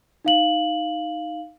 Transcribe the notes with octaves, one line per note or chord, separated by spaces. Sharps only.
D#4 F5 F#7